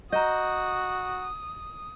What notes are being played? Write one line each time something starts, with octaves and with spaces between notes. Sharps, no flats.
F#4 D#5 A#5 D#6 G6